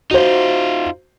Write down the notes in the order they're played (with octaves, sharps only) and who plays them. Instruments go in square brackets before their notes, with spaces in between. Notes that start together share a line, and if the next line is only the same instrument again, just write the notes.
[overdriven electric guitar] D#4 F4 [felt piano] F#4 C5